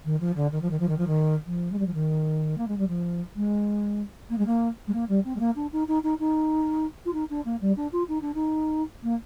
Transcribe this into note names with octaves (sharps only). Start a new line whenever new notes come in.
D#3
F3
D3
D#3
F3
D#3
F3
D#3
F3
D#3
F3
G#3
G3
F3
D#3
A#3
G#3
G3
F3
G#3
A#3
G#3
A#3
G#3
A#3
G3
C4
G#3
A#3
D4
D#4
D#4
D#4
D#4
F4
D#4
D4
A#3
G3
D4
F4
D#4
D4
D#4
A#3